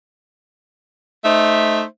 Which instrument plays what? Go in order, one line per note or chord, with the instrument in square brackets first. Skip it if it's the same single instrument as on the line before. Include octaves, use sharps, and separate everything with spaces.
[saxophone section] A3 D#4 C5 E5